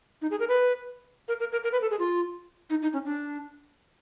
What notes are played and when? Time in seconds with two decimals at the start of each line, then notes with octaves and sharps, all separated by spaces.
0.22 D#4
0.31 G#4
0.40 A#4
0.48 B4
1.28 A#4
1.40 A#4
1.52 A#4
1.64 A#4
1.72 B4
1.82 A4
1.90 G#4
1.99 F4
2.70 D#4
2.82 D#4
2.93 C#4
3.06 D4